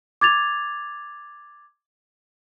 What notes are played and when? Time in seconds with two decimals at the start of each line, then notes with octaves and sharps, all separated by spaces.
0.21 D6 G#6 A6 F7